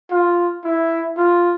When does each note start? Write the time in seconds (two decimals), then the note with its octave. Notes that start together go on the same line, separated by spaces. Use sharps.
0.10 F4
0.64 E4
1.17 F4